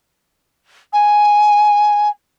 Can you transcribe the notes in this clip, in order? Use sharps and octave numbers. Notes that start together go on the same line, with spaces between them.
G#5